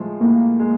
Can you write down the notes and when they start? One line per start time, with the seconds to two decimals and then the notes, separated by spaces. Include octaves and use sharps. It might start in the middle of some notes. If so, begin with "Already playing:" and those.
Already playing: A2 F3 G#3
0.20 A2 A#3
0.60 G#3